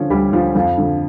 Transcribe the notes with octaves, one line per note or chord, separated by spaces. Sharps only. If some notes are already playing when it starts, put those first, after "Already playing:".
Already playing: D3 F3 C#4
D2 G3 G4
D3 F3 F4
F2 F3 F4
D3 F3